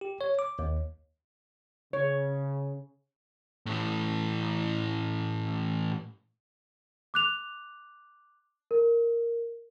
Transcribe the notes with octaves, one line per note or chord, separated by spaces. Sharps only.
G4
C#5
D6
D#2
C#3 C#5
A2 E3
D6 F#6 F7
A#4